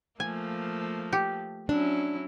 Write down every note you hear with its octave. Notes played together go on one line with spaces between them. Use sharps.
F3 A3 A#3 G#5
G4
F#3 C#4 D4 E4